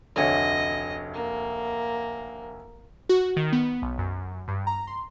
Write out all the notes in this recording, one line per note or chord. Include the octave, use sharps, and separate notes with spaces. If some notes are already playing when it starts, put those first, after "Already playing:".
F1 D2 C#5 D#5
A#3
F#4
D#3
B3
B1
F#2
G2
A#5
C6